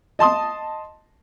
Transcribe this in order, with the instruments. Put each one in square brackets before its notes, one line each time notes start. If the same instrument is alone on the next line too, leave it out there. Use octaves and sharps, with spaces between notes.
[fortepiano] D#5 A5 C6 D#6